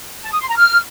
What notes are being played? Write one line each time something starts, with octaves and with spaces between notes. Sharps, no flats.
A5
D#6
C6
A#5
F6